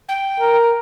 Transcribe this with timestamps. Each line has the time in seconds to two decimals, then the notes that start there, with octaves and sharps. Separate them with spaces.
0.09 G5
0.40 A#4